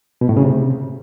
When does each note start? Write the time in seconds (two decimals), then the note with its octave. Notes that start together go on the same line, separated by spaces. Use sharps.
0.21 B2
0.29 A2
0.37 C#3
0.44 C3